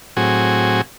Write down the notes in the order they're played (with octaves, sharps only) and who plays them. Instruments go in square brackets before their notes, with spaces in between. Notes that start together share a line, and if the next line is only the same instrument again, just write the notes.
[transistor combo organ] A2 F#3 C4 F#4 G#4 G#5